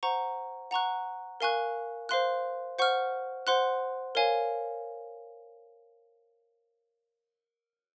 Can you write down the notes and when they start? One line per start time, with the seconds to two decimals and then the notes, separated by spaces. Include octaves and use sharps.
0.03 C5 F#5 A#5 C#6
0.71 F#5 A#5 C#6 F#6
1.40 A#4 F5 G#5 C#6 F#6
2.09 C5 F5 C6 F#6
2.79 C5 F#5 C#6 F6
3.47 C5 F#5 C6 F#6
4.15 A#4 C#5 F5 G#5